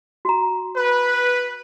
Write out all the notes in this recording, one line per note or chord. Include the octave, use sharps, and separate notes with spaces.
F#4 A#5
B4